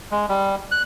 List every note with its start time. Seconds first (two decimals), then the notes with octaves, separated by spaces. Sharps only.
0.12 G#3
0.29 G3
0.71 F#6